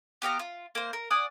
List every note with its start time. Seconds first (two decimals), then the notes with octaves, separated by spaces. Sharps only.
0.22 B3 G4 F5 A#5
0.39 F4
0.75 A#3 C5
0.93 A#4
1.10 D5 F#5 G#5 D#6